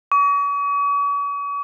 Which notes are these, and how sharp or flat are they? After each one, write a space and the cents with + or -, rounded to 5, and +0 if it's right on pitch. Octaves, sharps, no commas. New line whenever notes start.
C#6 +45